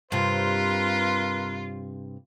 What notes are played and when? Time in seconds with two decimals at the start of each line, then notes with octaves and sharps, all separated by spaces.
0.12 G2 C3 F4 A#4 B4 C6